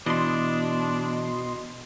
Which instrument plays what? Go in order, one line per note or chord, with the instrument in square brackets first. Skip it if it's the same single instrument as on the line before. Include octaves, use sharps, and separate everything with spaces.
[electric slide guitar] B2 [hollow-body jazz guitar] E3 [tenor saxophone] D4 [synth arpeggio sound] D#5 C6